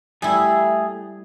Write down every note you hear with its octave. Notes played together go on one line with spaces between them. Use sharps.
G3 A3 E4 G#4